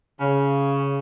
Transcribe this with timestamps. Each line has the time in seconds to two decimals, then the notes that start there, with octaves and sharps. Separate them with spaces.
0.20 C#3